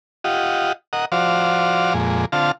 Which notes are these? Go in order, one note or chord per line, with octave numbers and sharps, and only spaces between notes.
F4 G4 D#5 F#5
A#4 D#5 F#5
F3 F#4 C5 D5 F5
F2 A#2 G#3
D3 C4 F4 F5 A5